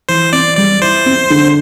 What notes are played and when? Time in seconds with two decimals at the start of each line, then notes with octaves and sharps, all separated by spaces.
0.09 E3 C5
0.33 C4 D5
0.57 G3 D5
0.81 E4 C5
1.06 C4
1.30 D3